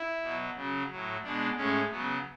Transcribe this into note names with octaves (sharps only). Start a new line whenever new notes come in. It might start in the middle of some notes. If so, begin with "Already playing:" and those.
Already playing: E4
B2 F#3
C#3 F#3
A2 F#3
B2 G#3 D4
A2 G#3 C#4
C#3 F#3 B3